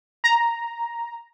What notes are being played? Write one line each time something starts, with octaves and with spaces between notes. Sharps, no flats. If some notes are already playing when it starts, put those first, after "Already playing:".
A#5